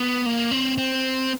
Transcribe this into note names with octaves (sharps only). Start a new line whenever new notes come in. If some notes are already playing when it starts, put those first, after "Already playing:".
Already playing: B3
A#3
C4
C4